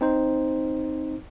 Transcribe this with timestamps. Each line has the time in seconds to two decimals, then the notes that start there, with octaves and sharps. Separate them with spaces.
0.01 C4 D#4 C5